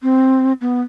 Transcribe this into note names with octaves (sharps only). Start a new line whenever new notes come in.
C4
B3